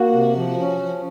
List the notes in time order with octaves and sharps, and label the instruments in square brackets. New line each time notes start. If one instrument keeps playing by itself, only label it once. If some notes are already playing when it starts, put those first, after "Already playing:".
Already playing: [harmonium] A#3 [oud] F#4
[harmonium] C3
F3
C#4
F3